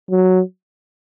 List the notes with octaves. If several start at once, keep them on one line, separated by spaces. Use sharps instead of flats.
F#3